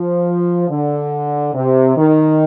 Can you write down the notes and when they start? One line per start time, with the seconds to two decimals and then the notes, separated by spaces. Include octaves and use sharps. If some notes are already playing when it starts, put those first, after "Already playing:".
Already playing: F3
0.69 D3
1.54 C3
1.97 D#3